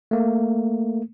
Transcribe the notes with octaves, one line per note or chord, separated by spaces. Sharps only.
A3 A#3